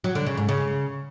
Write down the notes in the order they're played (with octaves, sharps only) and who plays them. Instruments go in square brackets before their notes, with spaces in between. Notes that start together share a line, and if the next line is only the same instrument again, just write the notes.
[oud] F#3
D3
C#3
G#2
C#3